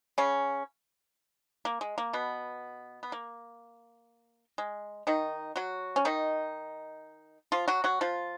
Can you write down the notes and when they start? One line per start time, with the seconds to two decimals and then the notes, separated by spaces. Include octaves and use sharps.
0.18 C#3 C#4
1.65 A#3
1.81 G#3
1.98 A#3
2.13 B2 B3
3.03 B3
3.12 A#3
4.58 G#3
5.07 D#3 D#4
5.56 F#3 F#4
5.96 C#4
6.05 D#3 D#4
7.52 F3 F4
7.68 F#3 F#4
7.84 F#3 F#4
8.01 F3 F4